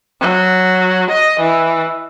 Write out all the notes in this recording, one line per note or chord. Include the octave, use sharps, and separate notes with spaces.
F#3
D#5
E3